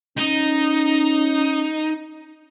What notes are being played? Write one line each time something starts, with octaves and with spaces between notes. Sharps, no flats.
C#4 D#4